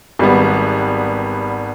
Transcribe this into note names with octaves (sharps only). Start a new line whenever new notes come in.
G#1 G3 B3